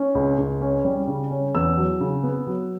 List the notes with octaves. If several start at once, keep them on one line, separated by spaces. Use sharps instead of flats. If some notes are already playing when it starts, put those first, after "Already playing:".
Already playing: C#4
C#2
C#2
C#4
G3
C#3
C#4
E2 E6
F#3
C#3
B3
F#3